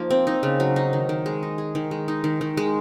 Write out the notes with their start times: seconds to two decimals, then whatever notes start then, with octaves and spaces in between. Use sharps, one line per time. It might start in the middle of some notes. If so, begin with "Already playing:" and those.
Already playing: F3 A#3 D#4 A#4
0.10 C4
0.27 D#4
0.43 C#3
0.60 F#3
0.76 D#4
0.93 D#3
1.09 D#3
1.26 G#3
1.43 D#4
1.58 G#4
1.75 D#3
1.91 G#3
2.08 D#4
2.24 D#3
2.41 D#3
2.57 G#3